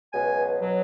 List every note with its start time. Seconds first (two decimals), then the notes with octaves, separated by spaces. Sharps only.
0.14 C#2 B2 F#3 G#5
0.61 B2 F#3